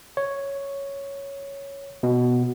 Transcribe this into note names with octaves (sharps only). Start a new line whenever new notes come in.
C#5
B2